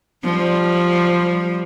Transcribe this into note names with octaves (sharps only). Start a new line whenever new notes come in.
F3 G3